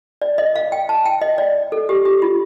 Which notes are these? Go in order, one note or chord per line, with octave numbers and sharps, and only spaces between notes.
D5
D#5
F5
G5
A5
G5
D#5
D5
A4
G4
G4
F4